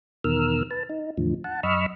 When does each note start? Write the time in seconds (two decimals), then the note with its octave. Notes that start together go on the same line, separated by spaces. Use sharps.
0.24 E2 B2 D#3 A#4 E6 F6
0.71 B4 A5
0.89 D#4
1.17 E2 A2 D3 F3
1.44 F#5 A5
1.63 F#2 D#5 B5 C#6 E6 F6